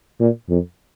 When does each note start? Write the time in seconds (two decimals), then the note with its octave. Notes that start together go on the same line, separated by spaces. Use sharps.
0.20 A#2
0.49 F2